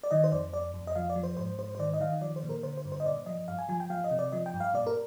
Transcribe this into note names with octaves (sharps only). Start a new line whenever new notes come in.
D5
D#3 D#5
C5
F2 D5
F2 D5
F2
D#5
F3 F5
D5
F3
C5
G#2 C5
G#2 C5
C5
D#3 D5
D#5
D#3 F5
D#5
F3 D5
C5
A#2
A#4
D3 C5
C5
G2
C5
D#5
A#2 D5
F3 D#5
G2 F5
G#5
F3 G#5
G5
F3 F5
D#5
C3
D5
F3 D#5
G5
G2
F5
A#2 D5
A#4